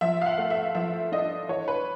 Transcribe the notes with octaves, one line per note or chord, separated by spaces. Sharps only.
F3 E5
F5
F#5
A3
E5
F3 E5
D4 D#5
E3 C#5
B4